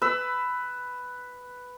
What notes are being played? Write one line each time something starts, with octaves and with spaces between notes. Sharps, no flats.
B4 E6